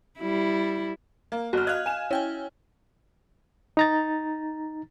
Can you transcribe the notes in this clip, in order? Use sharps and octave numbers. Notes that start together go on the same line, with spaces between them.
G3 E4
A#3
G1 F#4 F6
D#5 F5 F6 F#6 G#6
G#5 E7
C#4 E4 G5 G#5
D#4 A#5 A6